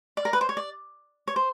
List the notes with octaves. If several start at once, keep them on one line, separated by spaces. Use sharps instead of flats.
D5
A#4
B4
C5
C#5
D5
C#5
C5